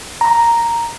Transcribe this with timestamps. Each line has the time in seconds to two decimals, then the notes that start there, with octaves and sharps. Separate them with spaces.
0.21 A#5